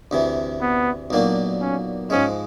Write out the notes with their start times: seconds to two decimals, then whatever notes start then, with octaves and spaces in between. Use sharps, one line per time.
0.11 D2 C3 E3
0.61 B3
1.10 B1 A#2 F#3 A#3 D4
1.61 C#4
2.10 G#2 F3 G#3 C#4